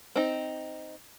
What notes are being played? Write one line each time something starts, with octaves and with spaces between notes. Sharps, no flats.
C4 D#4